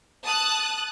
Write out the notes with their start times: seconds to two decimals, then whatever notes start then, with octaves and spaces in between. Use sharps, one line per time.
0.23 A5 D#6 F#6